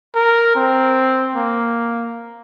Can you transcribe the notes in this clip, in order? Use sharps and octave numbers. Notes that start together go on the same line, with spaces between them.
A#4
C4
A#3